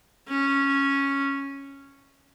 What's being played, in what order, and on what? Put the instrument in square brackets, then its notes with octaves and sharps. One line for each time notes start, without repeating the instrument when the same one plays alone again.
[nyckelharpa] C#4